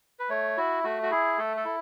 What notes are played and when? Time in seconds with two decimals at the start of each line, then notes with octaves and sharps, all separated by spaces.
0.19 B4
0.29 A3 C#5
0.57 E4 F#4
0.84 A3 F#4
1.03 F#4
1.11 E4 G#4
1.38 A3 A4
1.57 A4
1.65 E4